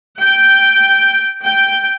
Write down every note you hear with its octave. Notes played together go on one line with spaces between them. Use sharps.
G5
G5